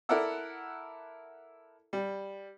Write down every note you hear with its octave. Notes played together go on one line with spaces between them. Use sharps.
E4 A4 A#4 D5 F#5 E6
G3